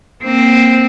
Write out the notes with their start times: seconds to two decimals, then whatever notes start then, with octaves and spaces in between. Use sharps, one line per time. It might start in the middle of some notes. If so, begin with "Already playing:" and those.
0.23 A#3 C4